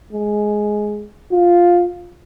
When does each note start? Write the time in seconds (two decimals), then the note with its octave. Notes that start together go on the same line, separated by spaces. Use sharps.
0.13 G#3
1.32 F4